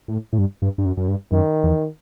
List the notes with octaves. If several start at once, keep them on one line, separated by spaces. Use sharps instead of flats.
A2
A2
G2
G2
G2
F#2
F#2
G2
F#2 D#3
E2